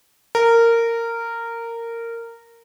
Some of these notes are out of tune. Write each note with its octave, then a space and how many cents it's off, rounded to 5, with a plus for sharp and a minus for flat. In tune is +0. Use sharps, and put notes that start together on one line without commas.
A#4 -15